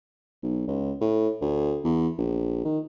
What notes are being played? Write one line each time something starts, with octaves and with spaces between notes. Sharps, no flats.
B1
C#2
A2
D2
E2
A#1
D#3